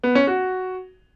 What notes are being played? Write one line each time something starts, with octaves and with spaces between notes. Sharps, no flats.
B3
C#4
F#4